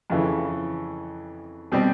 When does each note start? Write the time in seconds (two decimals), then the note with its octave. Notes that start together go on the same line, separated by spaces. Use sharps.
0.10 F2 C#3 E3
1.72 B2 G3 C4